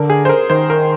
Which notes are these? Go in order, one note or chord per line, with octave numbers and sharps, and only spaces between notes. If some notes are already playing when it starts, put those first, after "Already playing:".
Already playing: D3 A#4
G#4
C5
A#4
D#3 C5
A#4